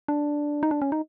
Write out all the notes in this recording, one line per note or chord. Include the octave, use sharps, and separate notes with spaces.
D4
D#4
D4
C#4
D#4